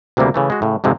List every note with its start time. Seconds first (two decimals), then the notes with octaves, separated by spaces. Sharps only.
0.17 D2 C3 E3 G3 A#3
0.34 C#3 E3 A3
0.50 G#3 F#4
0.62 A2 C#3
0.84 F2 G#2 C3 G#3 C4